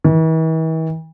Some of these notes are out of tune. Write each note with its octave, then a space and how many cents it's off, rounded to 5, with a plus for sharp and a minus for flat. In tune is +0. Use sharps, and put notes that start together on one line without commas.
E3 -45